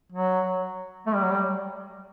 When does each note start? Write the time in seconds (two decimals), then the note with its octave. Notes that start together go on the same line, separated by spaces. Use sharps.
0.12 F#3
1.07 A3
1.15 G3
1.23 F#3
1.31 G3